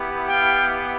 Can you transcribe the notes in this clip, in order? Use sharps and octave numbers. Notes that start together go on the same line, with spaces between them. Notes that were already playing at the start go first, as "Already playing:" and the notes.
Already playing: B3 E4 G4
F5 G5